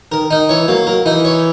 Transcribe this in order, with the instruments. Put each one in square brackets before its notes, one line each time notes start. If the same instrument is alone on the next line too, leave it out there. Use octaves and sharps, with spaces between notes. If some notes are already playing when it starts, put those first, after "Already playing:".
[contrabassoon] D#3 [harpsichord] A#4
[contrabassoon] D#3 [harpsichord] D#4
[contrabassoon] E3 [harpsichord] C#5
[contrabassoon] F#3 [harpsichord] A#3
[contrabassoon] F#3 [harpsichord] A#4
[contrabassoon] E3 [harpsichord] D#4
[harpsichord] C#5